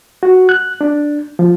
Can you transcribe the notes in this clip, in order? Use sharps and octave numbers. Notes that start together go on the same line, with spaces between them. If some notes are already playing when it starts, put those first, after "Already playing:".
F#4
F#6
D4
F3